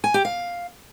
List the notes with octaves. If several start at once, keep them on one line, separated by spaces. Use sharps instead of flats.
G#5
G4
F5